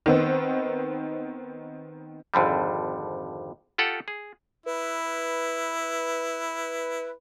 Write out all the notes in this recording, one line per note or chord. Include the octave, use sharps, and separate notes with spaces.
D#3 B3 C4
G#1 F2 D3 G3
F4 G4 A4 F#5
G#4
E4 B4